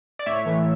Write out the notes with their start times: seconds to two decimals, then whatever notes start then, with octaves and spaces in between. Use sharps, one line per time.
0.19 D5
0.26 A2 C#5 E5
0.46 E3 A3